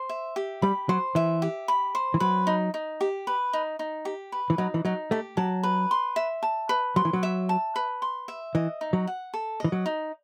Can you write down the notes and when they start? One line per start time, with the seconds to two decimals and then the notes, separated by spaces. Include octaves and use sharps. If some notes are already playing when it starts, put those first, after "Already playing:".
Already playing: C5
0.09 E5
0.36 G4
0.62 G3 B5
0.89 F#3 C5
1.15 E3 E5
1.42 G4
1.68 B5
1.95 C5
2.14 E3
2.20 F#3 B4
2.47 D#4
2.74 D#4
3.01 G4
3.27 B4
3.53 D#4
3.79 D#4
4.05 G4
4.32 B4
4.50 E3
4.58 F#3 D#4
4.74 E3
4.85 F#3 D#4
5.11 A3 G4
5.37 F#3 A5
5.63 B4
5.91 C6
6.16 E5
6.43 A5
6.69 B4
6.96 F#3 C6
7.05 E3
7.13 F#3
7.23 E5
7.49 A5
7.76 B4
8.02 C6
8.28 E5
8.55 E3 D#5
8.81 D#4
8.93 F#3
9.07 F#5
9.34 A4
9.60 E3 D#5
9.72 F#3
9.86 D#4